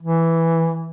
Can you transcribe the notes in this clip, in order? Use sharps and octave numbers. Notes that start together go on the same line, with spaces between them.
E3